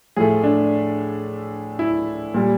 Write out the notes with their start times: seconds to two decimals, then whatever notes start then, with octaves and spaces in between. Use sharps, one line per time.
0.16 A2 F3 A3 G#4
0.43 D4
1.79 E4
2.34 A#2 G3